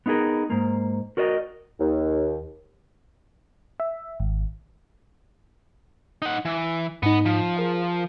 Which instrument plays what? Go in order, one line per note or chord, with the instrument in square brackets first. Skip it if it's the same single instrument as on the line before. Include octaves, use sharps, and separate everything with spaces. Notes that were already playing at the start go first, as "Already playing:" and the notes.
[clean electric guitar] B3 D#4 E4 G#4 A#4
G#2 A#3
F#4 A#4 D5 D#5
[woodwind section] D#2
[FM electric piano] E5
G#1
[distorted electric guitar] D#4 F#5
E3
[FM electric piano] G#2 D#4 [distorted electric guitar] B3
[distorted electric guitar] F3
[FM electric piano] G#4 A#4 F5